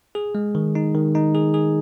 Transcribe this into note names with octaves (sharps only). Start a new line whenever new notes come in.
G#4
G#3
D#3
D#4
D#3
D#4
G#4
G#4